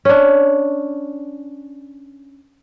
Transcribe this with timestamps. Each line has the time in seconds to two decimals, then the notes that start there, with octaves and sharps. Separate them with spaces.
0.05 C#4 D4